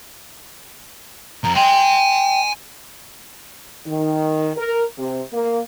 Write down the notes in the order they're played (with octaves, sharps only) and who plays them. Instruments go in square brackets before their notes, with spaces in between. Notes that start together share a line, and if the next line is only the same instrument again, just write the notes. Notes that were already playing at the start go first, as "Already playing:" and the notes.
[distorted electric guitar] F2 [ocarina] A#5
[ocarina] G5 [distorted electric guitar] G#5 C6
[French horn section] D#3
A#4
C3
A#3